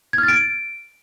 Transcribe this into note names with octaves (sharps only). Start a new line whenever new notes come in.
G#6
F6
A6
D7